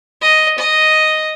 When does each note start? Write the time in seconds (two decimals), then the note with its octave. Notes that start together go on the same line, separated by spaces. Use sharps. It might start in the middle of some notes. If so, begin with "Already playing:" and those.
0.21 D#5
0.58 D#5